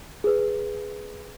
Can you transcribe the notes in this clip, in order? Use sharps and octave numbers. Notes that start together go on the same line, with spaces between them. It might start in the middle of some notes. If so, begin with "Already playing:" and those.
G#4 B4